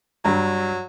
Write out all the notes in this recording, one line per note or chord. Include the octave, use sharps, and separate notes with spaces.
G2 F#3 A#5